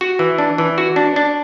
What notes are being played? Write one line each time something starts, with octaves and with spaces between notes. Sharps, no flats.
F#4
E3
D4
E3
F#4
D4
D4